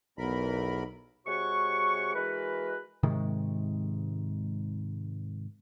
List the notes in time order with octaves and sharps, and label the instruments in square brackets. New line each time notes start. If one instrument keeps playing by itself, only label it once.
[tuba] B1 [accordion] E2 A#4 B5
[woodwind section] C3 G#3 F#4 C#5 F#5 C#6
E3 G#3 F#4 A#4 B4
[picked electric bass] G#2 C3 D#3 G#3